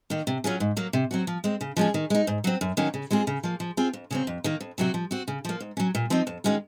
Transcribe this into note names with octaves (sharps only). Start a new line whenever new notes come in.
D#3 A#3
C3
F#3 C#4 F4 G#4
G#2
F#3 A#3
C3
F#3 C4 F#4
F3
G#3 C4
C#3
F3 G#3 C#4 G#4
D#3
G#3 D#4
G#2
F#3 C4
F#2
D#3 F#3 A#3 C#4
C#3
G#3 C4 F4 G#4
C#3
F3 A#3
F3
C4 F4 G#4
F2
C#3 F#3 C4
F2
D#3 A#3
F2
C3 F#3 C4 F#4
F3
C4 F#4
C#3
F3 A#3
G#2
F#3 C#4
A#2
F3 C4 D#4
F2
D#3 G#3 C#4 F#4